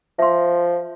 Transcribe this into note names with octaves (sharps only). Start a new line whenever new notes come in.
F3 E5 C6